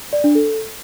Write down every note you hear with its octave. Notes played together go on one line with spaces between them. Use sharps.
D5
D4
A4